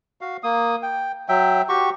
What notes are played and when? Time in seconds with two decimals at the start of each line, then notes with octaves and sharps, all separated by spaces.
0.21 F#4 F5
0.43 A#3 D#6
0.83 G5
1.29 F#3 E5 G5
1.69 F#4 G4 C#6